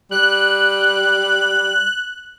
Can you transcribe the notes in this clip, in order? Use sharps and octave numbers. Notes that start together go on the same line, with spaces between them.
G3 F#6